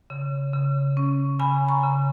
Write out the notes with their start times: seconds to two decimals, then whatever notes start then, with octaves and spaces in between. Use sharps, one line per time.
0.10 C#3
0.53 C#3
0.97 C#4
1.39 C#3 G#5 B5
1.68 A#5 C#6
1.83 C#3